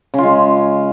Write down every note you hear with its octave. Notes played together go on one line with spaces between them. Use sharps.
C#3 G#3 F4